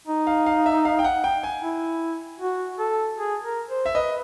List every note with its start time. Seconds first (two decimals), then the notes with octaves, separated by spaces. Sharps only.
0.07 D#4
0.27 F5
0.46 F5
0.66 E5
0.85 F5
0.99 G5
1.04 F#5
1.24 G5
1.43 G#5
1.63 E4
2.40 F#4
2.79 A4
3.17 G#4
3.43 A#4
3.69 C5
3.86 E5
3.95 B4 D#5